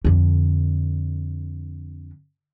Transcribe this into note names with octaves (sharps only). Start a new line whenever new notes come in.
F2 D3